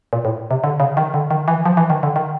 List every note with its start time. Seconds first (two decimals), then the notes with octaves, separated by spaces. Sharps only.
0.13 A#2
0.25 A2
0.51 C3
0.64 D3
0.80 C#3
0.97 D#3
1.14 D3
1.31 D#3
1.48 E3
1.66 F3
1.77 E3
1.90 D#3
2.03 D3
2.16 D#3